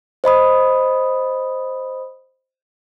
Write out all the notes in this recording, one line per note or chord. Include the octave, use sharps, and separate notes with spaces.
C5 D#5 B5 D#6